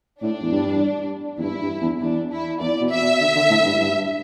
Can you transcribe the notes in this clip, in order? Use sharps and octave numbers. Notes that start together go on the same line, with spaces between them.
A2 D4
E2
G2
E2
G2 E4
G2
E2
E2 D4
E4
E2 D5
B2
E5
B2
D3
D3
A2
G2
G2